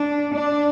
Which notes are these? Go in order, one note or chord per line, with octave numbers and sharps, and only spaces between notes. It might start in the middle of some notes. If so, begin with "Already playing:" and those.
Already playing: D4
D4